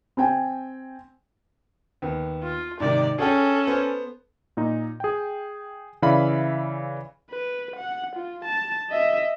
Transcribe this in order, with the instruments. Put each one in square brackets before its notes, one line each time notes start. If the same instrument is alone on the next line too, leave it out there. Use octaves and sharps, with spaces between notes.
[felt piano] C4 G5 G#5
[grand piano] D#2 B3
[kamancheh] F4
[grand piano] G#2 C3 D#3 [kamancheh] D5
[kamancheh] C#4 A4 [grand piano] G#4 F#5 G5
[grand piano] B3 C5
[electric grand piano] A#2 D#4
G#4 G5
C#3 E3 D5 E5 F5 B5
[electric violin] B4
F#5
F4
A5
D#5 E5